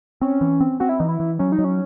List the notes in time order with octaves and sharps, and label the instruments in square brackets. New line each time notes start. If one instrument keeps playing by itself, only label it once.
[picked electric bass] C4 [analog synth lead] C#4
[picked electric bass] E3
C4
[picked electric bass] C4 [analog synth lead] F#4
[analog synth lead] E4
[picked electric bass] E3 [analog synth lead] D#4
[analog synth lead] E4
[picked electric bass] E3
[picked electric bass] F#3 [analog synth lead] C#4
[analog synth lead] D#4
[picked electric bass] F#3
[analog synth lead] C#4